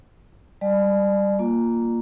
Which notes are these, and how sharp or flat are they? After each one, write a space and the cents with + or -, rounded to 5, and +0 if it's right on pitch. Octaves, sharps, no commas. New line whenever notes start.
G3 +0 D5 +35 G#5 +45
A#3 +0 F4 +0